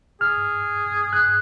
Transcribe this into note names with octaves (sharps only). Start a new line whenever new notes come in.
G#4 F6
F#6